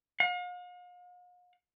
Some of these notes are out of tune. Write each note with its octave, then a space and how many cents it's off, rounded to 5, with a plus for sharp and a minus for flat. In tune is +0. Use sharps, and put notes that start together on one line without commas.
F5 +45